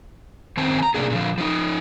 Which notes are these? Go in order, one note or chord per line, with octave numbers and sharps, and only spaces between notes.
D#3 C4 C5 A5
G#5 A#5
A2 C3 A#3 D4 G#4
A#2 D3 F3
F3 D#4